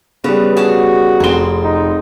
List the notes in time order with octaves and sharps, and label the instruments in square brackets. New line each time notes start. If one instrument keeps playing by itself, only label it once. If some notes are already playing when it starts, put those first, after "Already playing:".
[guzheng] C#3 [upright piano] G3 B3 [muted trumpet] B4
[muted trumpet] F#4 [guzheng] G#4 A5
[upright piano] F1 G7 [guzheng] C4 G#4
[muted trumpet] D#4